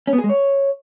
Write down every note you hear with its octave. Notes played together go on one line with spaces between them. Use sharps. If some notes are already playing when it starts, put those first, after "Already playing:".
C#4
B3
G#4
G#3
C#5